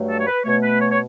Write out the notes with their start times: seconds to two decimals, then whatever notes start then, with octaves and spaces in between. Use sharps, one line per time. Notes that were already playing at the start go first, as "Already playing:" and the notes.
Already playing: G2 F#3 A3
0.10 A4
0.19 C#5
0.27 B4
0.45 B2 A3 C#5
0.63 B4
0.80 C#5
0.91 C#5